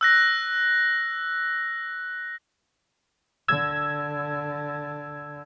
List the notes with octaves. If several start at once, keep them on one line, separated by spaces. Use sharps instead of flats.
E6 F#6 A#6
D3 E6 G#6